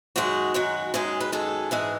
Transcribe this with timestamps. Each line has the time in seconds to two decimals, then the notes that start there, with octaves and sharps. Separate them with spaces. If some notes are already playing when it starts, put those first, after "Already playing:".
0.16 F#2 D#3 G#3 F#4
0.54 F#2 D#3 G#3 F#4
0.94 F#2 D#3 G#3 G#4
1.20 B4
1.32 F#2 D#3 G#3 A4
1.71 G#2 E3 G#3 G#4